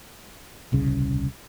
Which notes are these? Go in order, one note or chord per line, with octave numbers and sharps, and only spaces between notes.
D#1 C2 C#3